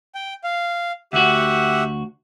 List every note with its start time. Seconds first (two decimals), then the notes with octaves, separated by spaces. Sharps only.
0.15 G5
0.44 F5
1.13 D2 F#4 G4 E5 F#5